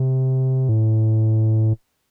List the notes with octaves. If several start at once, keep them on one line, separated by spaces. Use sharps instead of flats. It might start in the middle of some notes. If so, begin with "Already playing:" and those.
Already playing: C3
A2